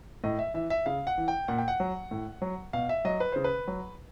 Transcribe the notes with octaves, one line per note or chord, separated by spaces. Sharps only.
A2 D#5
E5
E3 E5
E5
C#3 F5
F#5
E3
G5
A#2 F#5
G5
F#5
F#3
A2
F#3
B2 F5
E5
F#3 D#5
B4
C#3 C5
B4
F#3